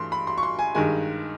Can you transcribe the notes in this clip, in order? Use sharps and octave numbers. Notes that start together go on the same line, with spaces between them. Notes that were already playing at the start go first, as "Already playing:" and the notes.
Already playing: G2 E3 A3 C6
B5
C6
C#6
C6
G#5
G2 D#3 G#3 G#5